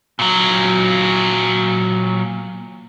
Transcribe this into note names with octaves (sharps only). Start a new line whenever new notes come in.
A#2 F#3